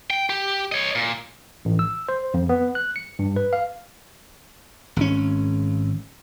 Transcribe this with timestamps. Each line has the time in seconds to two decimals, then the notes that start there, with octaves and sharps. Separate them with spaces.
0.10 G5
0.30 G4
0.72 C#5 D#5
0.95 A#2
1.65 A1
1.79 E6
2.09 C5
2.34 F2
2.49 B3
2.75 F#6
2.96 C#7
3.19 G2
3.36 B4
3.53 F5
4.96 G#1 C#4